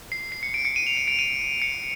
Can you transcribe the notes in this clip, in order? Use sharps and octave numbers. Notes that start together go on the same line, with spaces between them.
C7
C7
C#7
D7
C#7
D#7
F7
D#7
D7
D#7
C#7